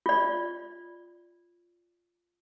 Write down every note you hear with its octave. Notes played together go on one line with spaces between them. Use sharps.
F4 D5